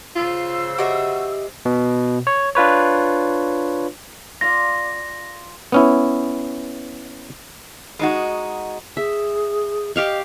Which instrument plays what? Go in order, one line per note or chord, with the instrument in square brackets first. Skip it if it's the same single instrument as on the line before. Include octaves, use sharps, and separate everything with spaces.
[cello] C#3 C5 [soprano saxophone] F4 [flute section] E6
[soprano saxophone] F#4 [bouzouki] G4 D#5 E5
[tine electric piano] B2
C#5
D4 F4 B4 C#5
[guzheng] F4 D5 [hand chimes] A#6
[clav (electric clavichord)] B3 C#4 E4
[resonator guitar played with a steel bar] G#3 D#4 F#4
[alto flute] G#4 [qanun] E5
[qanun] G4 F5 C#6 [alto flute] D#5